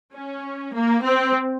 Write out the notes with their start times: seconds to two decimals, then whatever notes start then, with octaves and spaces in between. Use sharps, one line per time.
0.14 C#4
0.74 A#3
1.03 C4